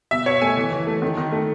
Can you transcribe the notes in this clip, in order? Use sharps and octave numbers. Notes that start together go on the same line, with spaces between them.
B2 E5
B2 C#5
A3 G#5
E3
E3
A3
D#3
D#3
A3